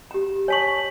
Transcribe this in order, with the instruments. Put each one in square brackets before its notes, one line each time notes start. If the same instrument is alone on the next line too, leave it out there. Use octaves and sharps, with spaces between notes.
[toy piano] G4 A#5
[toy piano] C#5 A5 C#6 [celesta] G#5 B6 F#7